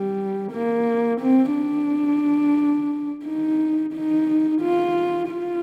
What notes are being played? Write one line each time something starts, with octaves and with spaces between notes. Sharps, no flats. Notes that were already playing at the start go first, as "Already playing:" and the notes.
Already playing: G3
A#3
C4
D4
D#4
D#4
F4
F4